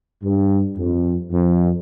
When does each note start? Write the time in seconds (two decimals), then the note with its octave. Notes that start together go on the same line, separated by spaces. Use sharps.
0.23 G2
0.77 F2
1.32 F2